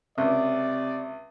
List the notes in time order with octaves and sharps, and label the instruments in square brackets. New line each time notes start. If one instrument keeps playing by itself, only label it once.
[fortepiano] C#2 [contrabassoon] C3 [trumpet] D5 [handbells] E5